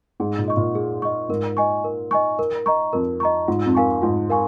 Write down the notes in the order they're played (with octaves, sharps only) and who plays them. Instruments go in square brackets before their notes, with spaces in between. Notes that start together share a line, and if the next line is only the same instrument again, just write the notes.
[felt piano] G#2 [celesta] G#4
[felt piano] A#2
[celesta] D#5 C#6
[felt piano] A#2
[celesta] G#4
D#5 C#6
[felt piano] G#2 [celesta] A#4
[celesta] D#5 G#5 C#6
A#4
D#5 G#5 C#6
A#4
D#5 A#5 C#6
[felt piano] F2 [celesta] A#4
[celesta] D#5 A#5 C#6
[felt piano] G#2 [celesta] F4
[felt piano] F2
[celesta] A#4 F5 G#5 C#6
[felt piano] G#2 [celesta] F4
[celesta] A#4 F5 G#5 C#6